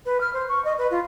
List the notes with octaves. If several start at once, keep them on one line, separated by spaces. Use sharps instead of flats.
B4
F6
C5
C#6
D#5
B4
F4